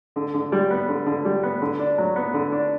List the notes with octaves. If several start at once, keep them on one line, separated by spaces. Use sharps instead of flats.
D3
D3
G3
B3
D3
D3
G3
B3
D3
D4
F#3
B3
D3
D4